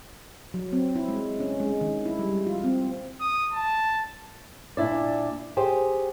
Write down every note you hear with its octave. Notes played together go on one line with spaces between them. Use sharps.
F#3
C4
E4
G#3
C#4
G#3
D#3
E4
G3
F4
C4
D#6
A5
A#2 D4 E4 D5
G4 G#4 C5